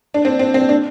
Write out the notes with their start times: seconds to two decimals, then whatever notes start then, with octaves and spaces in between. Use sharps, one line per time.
0.14 D4
0.25 C4
0.39 C4
0.54 C4
0.69 D4